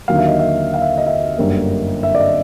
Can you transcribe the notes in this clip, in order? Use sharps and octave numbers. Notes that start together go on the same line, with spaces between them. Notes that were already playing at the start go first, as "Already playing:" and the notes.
D#2 D3 F#3 A#3 F5
E5
D#5
E5
F5
E5
D#5
E5
G1 F#2 D3 G3 A#3
E5
D5
D#5